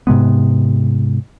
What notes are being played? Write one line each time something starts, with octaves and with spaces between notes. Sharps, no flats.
G#2 C3 G#3 B3